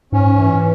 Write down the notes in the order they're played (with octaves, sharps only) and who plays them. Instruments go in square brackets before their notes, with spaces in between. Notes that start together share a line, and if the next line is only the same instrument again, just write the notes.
[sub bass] G#2 [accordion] C#4
[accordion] E3